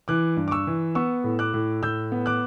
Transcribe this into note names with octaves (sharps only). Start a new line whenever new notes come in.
E3 D6 F#6
G2
D6
C#6 E6
E3
B3 C#6 E6
A2
D6 F#6
A2
A2 E6 G6
B3
D6 F#6